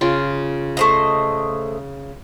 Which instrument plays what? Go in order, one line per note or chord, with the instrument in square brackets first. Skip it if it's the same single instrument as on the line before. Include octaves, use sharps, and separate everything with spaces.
[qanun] C#3 F4
[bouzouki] A3 C5 D#5